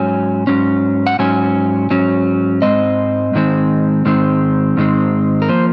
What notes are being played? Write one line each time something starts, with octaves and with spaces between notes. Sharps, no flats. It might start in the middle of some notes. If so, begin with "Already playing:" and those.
Already playing: G#2 F#3 C#4 G#5
G#2 F#3 C#4
F#5
G#2 F#3 C#4 G#5
G#2 F#3 C#4
G#2 D#3 G#3 C4 D#5
G#2 D#3 G#3 C4
G#2 D#3 G#3 C4
G#2 D#3 G#3 C4
A#4
F3 A#3 C5